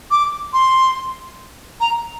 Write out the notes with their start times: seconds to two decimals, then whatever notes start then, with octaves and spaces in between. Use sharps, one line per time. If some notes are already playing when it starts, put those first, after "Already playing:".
0.11 D6
0.53 C6
1.80 A#5